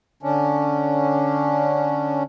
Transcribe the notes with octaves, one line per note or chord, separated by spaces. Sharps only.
D3 C#4 D4